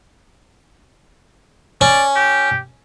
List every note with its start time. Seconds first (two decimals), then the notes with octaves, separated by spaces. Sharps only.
1.81 C#4 D5
2.16 G4